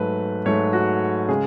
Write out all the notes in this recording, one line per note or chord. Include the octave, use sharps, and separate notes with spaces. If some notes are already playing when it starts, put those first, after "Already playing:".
Already playing: G#2 F#3 A3 B4
G#2 F#3 A3 C#5
F#4
C#3 G#3 G#4